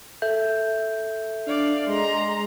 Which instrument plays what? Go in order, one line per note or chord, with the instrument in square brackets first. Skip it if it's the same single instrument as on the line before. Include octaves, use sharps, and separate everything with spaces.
[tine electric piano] A4 E5 G6
[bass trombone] D4 [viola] D5 F5
[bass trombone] G#3 [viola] A#5 C6